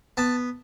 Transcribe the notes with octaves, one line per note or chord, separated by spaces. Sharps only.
B3 A5